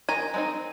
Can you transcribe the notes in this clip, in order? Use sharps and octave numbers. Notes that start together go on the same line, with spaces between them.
D#3 G#5 A#5
G#3 C4 D#4